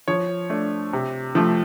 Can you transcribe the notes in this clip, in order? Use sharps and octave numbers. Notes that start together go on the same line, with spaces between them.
F3 C#5
A3 D4
C3
F3 A3